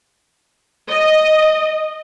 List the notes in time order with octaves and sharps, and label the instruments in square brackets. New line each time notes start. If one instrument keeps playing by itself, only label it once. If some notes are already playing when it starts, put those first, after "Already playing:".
[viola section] D#5